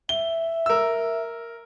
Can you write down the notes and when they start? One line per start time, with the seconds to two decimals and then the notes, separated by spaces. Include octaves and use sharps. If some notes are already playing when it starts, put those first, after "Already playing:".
0.09 E5 G7
0.66 A#4 E6